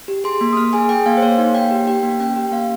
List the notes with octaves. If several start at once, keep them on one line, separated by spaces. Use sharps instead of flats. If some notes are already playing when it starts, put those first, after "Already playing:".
G4
G#4 C6
A#3
D#6
A#3 F6
G#4 G#5
G#4 G5
A#3 F5
C5
A#3 C#5
D#4 F5
A#3 G5
G4
G4 G5
A#3
C#4 G5
G4
A#3 F5